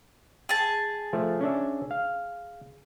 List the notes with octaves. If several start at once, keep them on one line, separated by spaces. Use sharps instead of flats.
G#4 A5
F3 A3
C#4 D4 E5
F5